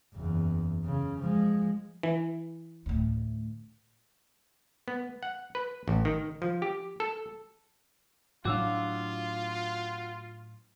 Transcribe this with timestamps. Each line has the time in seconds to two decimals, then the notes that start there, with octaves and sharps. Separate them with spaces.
0.15 F#1 E2
0.85 C#3
1.21 F3 G#3
2.03 E3
2.86 D2 A2
4.88 B3
5.23 F#5
5.55 B4
5.88 A1
6.05 D#3
6.42 F3
6.62 G4
7.00 A4
8.45 A2 F#3 D4 F4 F#4 F5 D6 E6